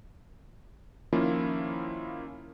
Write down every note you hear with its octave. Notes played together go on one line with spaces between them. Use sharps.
D#3 F3 A#3 C#4 E4 F4